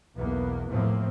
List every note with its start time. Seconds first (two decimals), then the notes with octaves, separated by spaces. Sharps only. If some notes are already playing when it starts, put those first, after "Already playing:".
0.15 B1 E2 A#3 B3
0.70 E2 A2 F3 A3 A#3 C4